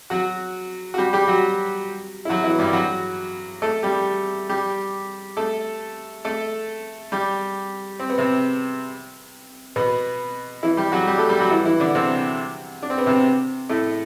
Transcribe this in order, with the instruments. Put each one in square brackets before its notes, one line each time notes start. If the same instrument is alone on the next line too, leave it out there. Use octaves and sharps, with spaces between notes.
[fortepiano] F#3 F#4
F#4
G3 G4
G3 G4
F#3 F#4
E4
F#3 F#4
E3 E4
G2 G3
F#3 F#4
A3 A4
G3 G4
G3 G4
A3 A4
A3 A4
G3 G4
C4
B3
C3 C4
B2 B3
E3 E4
G3 G4
F#3 F#4
G3 G4
A3 A4
G3 G4
F#3 F#4
E3 E4
E3 E4
D3 D4
C3 C4
D4
C4
B3
C3 C4
A2 A3